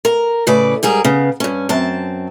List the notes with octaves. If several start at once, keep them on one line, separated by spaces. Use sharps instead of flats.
A#4
A2 C#3 A4 B4 D5
G#2 G3 G#4 A#4
C#3 B3
G2 C#4
F#2 C4 A5